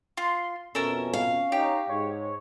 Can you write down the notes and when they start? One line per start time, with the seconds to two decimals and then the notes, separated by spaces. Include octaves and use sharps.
0.17 F4 C6
0.75 F2 B2 C#4 A4 A#4 E5
1.14 F5
1.52 D#4 G4 C#5
1.89 G#2 C#5